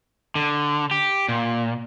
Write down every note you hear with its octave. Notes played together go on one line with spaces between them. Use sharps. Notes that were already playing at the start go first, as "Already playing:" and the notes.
D3
G4
A#2